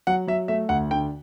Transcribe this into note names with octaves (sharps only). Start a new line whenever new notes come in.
F#3 F#5
F#3 E5
A3 E5
D2 F#5
D3 G5